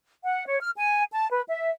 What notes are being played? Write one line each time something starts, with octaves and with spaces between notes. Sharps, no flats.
F#5
C#5
F6
G#5
A5
B4
E5